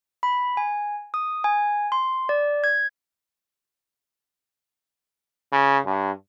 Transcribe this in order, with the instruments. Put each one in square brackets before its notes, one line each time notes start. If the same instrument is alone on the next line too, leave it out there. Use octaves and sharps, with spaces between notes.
[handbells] B5
G#5
D#6
G#5
C6
D5
G#6
[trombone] C#3
G2